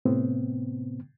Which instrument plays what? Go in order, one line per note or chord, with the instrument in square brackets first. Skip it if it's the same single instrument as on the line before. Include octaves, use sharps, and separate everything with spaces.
[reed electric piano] A2 C3 B3 C4